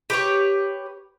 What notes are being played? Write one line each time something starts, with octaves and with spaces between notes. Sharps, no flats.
G4 B4 C#5